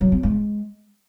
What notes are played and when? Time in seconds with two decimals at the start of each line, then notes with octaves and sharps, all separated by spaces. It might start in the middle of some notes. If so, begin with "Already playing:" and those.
0.01 F#3
0.12 C4
0.23 G#3